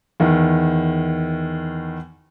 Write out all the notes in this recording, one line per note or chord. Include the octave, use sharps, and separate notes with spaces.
E2 D#3